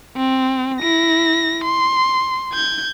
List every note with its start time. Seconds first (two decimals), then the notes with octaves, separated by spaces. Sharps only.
0.16 C4
0.81 E4 A#6
1.64 C6
2.54 G6 G#6